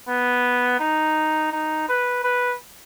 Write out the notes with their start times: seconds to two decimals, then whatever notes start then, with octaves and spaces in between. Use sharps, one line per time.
0.08 B3
0.80 D#4
1.52 D#4
1.88 B4
2.24 B4